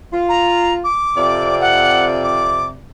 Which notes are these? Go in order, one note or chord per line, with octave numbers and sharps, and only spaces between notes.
F4
A#5
D6
F2 C3 D5
F#5
D6